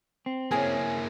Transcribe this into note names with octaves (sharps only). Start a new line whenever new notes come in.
C4
F#2 F#3 A#3 E4 G#4 C#5